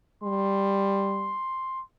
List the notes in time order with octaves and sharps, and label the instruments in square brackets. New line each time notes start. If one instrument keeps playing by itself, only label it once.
[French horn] G3 [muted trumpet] C6